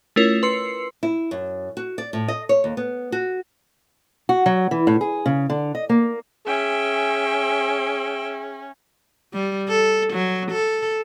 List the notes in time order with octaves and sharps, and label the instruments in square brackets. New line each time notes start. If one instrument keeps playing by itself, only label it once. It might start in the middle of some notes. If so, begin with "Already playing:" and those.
[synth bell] A3 C#4 E4 F4 A#4 C#5
B4 C6 E6 C7 C#7
[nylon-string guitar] E4
F#2
F#4
D5
A2
D#5
C#5
D#2
B3
F#4
[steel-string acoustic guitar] F#4
F#3
E3
A2
G#4
C#3
D3
D#5
A#3
[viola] C#4 [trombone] G#4 [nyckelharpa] E5 G5
[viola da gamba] G3
A4
F#3
A4